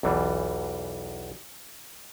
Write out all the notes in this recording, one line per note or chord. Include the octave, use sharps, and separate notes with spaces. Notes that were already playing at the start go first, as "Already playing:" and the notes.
B1 E2 E3 G3